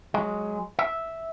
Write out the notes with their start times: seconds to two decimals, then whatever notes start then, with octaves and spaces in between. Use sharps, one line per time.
0.14 F#3 G#3
0.79 E5